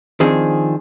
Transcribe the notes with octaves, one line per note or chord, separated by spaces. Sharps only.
D#3 F3 C4 D4 G#4